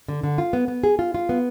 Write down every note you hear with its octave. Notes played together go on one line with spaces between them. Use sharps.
D3
D3
F4
B3
B3
G#4
F4
F4
B3